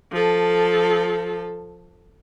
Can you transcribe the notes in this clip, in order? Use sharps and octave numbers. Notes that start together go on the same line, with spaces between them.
F3 A4